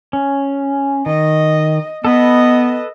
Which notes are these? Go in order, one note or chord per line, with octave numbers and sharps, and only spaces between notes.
C#4
D#3 D#5
B3 A4 B4 D#5 B5